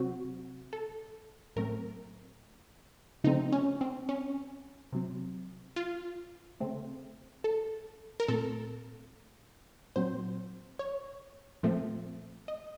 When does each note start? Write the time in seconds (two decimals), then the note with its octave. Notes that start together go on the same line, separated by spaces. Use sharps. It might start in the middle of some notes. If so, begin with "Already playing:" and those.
Already playing: C3 F#3 C4 F#4
0.73 A4
1.56 A2 F#3 A3 C4 A#4
3.24 C#3 F3 A3 C4 D#4
3.52 C#4
3.81 C4
4.09 C#4
4.93 C3 F#3 C4
5.76 F4
6.60 C#3 A3 C4
7.44 A4
8.20 A#4
8.28 A#2 A3 C4 A4
9.96 A#2 F#3 C4 C5
10.79 C#5
11.63 A#2 F3 A3 C4
12.48 D#5